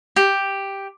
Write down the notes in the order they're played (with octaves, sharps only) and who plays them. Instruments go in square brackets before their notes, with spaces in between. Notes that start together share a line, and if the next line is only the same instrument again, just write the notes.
[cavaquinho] G4